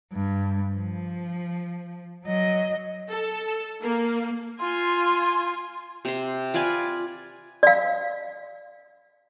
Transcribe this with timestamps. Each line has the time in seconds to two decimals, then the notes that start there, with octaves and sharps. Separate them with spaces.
0.12 G2
0.74 F3
2.26 F#3 D#5
3.09 A4
3.82 A#3
4.60 F4 G#5 C6
6.05 C3 C6
6.54 F4 B4 D5 G#5
7.63 D5 F5